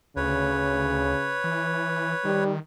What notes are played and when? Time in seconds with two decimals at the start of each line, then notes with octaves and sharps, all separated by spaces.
0.16 D2 C#3 B4 C#5
1.44 E3
2.25 D#3 G3